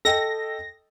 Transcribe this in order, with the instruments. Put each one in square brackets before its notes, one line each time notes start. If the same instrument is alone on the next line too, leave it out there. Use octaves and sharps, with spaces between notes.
[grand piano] A4 D#5 G5 [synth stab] A#6